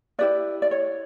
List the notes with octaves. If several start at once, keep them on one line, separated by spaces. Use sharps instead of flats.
E4 G4 B4 D5
D5
C#5